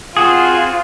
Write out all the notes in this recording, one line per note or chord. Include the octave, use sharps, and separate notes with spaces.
C4 F4 F#4 G#4 D#6